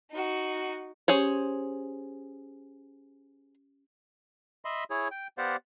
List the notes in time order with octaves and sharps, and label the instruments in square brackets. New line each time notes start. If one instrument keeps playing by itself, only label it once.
[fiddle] D#4 F#4
[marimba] C#4 G4 [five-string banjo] G#4 C5 C#5
[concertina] D#5 E5 B5 C6
E4 G#4 C#5
G5
B3 G4 C5 D5 F5 F#5